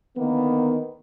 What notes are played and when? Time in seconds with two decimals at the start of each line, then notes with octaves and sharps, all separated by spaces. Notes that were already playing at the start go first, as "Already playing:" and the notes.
0.17 D3 D#3 A#3 B3